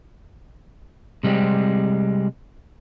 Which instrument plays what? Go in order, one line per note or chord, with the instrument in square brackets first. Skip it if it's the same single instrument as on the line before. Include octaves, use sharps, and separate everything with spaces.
[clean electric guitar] C3 G3 G#3 C4